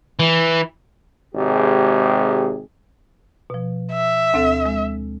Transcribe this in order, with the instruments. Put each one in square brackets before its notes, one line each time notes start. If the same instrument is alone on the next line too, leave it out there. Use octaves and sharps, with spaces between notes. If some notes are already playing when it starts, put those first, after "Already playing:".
[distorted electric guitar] E3
[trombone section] G#1 C3 G#3 G4 G#4
[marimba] B2 F3
[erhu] E5
[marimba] D2 C4 A4
G#3